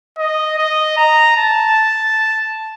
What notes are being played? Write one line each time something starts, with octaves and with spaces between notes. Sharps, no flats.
D#5
D#5
A#5
A5